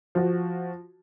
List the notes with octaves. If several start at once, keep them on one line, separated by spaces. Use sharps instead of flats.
F3 F#4